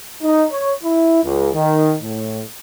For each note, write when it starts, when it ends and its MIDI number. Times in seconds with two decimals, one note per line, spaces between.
0.21 0.43 63
0.51 0.71 73
0.83 1.21 64
1.23 1.48 37
1.55 1.94 51
2.02 2.40 45